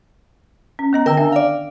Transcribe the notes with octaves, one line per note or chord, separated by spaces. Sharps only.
C#4
B3 D#5 A#5
D3 D#3 A#4 G5 E6
D4 E5 G#5
D5 F5